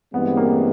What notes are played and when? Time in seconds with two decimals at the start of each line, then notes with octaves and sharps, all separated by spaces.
0.14 G2 E3 G#3 B3 C4
0.37 A#3